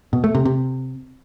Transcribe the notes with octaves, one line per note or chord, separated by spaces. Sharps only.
B2
A3
C3
C3